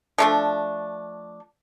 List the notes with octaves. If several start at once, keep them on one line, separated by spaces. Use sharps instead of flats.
F3 A3 D4